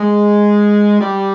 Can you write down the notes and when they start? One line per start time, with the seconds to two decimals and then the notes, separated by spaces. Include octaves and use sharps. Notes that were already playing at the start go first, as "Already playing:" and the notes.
Already playing: G#3
1.00 G3